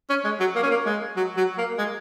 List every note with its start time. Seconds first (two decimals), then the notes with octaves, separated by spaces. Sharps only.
0.09 C#4
0.24 G#3
0.40 F#3
0.55 A#3
0.63 C#4
0.71 A#3
0.86 G#3
1.17 F#3
1.37 F#3
1.58 A#3
1.78 G#3